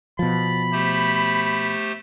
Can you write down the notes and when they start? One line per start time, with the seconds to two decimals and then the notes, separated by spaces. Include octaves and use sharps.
0.19 B2 F3 B5 A6
0.72 A3 G4 C5